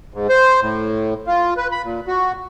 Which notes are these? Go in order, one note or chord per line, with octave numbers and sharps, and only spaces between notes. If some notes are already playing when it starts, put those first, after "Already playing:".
G#2
C5
A2
F4
B4
B5
A#2
F#4